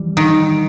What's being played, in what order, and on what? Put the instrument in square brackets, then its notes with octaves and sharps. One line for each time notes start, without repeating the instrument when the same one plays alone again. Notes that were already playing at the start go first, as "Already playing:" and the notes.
Already playing: [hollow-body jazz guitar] F2 E3 G3
[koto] D#3